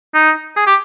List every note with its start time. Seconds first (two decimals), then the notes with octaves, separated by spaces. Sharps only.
0.15 D#4
0.56 G#4
0.67 G4